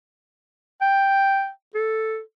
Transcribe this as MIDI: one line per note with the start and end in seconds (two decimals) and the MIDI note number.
0.81 1.49 79
1.75 2.20 69